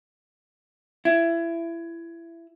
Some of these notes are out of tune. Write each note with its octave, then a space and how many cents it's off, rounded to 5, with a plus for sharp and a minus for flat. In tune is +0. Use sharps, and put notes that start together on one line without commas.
E4 +25